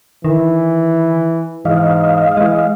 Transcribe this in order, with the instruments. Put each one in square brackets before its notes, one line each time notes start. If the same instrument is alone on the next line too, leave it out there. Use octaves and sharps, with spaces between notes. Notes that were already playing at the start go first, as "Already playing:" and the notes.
[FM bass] D#3 [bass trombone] E3
[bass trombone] G#2 [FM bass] E3 [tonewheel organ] D#5 F5
[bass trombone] E3 [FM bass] G#3